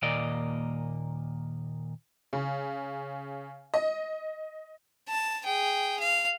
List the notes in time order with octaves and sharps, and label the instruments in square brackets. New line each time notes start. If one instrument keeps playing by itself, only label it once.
[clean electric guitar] D#2 A#2 A#3 D5 D#5
[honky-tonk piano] C#3
D#5
[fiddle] A5
G#4 G5
F5